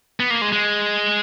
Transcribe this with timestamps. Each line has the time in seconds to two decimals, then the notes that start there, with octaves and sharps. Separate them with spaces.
0.20 B3
0.30 A#3
0.41 G#3
0.52 G#3